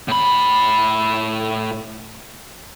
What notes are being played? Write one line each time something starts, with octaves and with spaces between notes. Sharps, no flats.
A2 B5